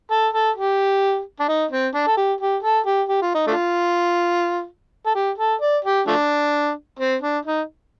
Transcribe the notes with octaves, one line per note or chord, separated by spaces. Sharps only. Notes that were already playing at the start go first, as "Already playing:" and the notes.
A4
A4
G4
D4
D#4
C4
D4
A4
G4
G4
A4
G4
G4
F4
D#4
A3 D4 F4
A4
G4
A4
D5
G4
F3 A3 D4
C4
D4
D#4